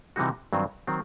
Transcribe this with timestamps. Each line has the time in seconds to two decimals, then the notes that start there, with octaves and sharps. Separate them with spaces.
0.16 C3 E3 G3 D#4 F#4
0.53 G2 D#3 F#3 C4
0.87 D#3 F#3 C4